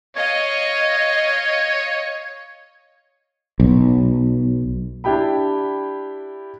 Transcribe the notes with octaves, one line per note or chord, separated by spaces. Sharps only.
C#5 D#5 F5
B1
D4 E4 G4 G5 B5